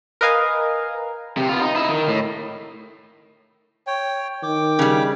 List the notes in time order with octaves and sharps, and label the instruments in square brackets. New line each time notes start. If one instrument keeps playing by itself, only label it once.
[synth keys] A#4 B4 D#5 F5 G#5
[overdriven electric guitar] C3
B3 F4
D#4
D#4 E4
D#3
A2
[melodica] C#5 G5
[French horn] D#3 [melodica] G5 D6
[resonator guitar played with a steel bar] C#3 G3